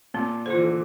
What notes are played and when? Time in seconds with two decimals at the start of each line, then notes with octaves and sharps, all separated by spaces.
0.14 A#2 C4
0.46 D3 C5
0.50 E3 F4
0.63 D3